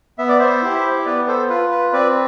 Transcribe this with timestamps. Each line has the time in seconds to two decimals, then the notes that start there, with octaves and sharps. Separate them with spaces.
0.18 B3 E5
0.29 D5
0.39 C5 E5
0.62 E4 G4
1.05 B3 B4 D5
1.27 A4 C5
1.49 F4 B4
1.71 B4
1.93 C4 B4 D5